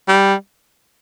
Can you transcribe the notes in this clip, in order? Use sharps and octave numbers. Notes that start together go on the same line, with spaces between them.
G3